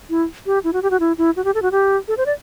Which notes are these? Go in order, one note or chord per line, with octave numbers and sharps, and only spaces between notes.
E4
G4
E4
F#4
G4
F#4
E4
E4
F#4
G4
A4
F#4
G4
A4
C5
D5